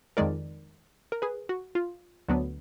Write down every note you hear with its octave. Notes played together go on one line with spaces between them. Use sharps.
F2 D#3 G#3 D#4 A#4 D5
A#4
G#4 B4
F#4
F4
D2 D3 F#3 B3 D4